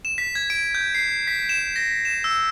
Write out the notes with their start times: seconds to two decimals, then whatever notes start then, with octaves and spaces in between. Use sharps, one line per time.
0.05 E7
0.18 B6
0.35 G#6
0.50 D7
0.75 G6
0.94 C7
1.27 B6
1.49 E7
1.76 A#6
2.05 E7
2.24 E6